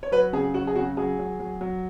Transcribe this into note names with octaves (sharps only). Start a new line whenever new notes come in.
C#5
F#3 B4
C#3 G#4
F#3 F#4
G#4
C#3 F#4
F#3 G#4
F#3
F#3
F#3